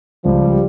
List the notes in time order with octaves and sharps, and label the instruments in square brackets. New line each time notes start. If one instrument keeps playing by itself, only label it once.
[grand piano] C#2 [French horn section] F3 G3